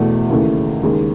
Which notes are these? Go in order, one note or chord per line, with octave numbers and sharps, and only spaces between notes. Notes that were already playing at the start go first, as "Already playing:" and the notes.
Already playing: E2 B2 A3
D#2 C#3 E3 A3
D#2 C#3 G#3 D#4 G#4